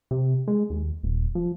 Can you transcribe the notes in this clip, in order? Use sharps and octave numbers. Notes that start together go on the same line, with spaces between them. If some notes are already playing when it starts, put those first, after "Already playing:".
C3
G#3
D#2
D#1
F3